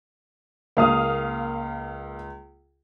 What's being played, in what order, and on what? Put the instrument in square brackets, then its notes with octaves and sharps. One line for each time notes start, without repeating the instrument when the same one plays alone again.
[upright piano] C#2 [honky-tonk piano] A#3 F5 D#6